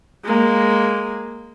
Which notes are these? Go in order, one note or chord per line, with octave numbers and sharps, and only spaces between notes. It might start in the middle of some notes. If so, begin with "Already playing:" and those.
G#3 A#3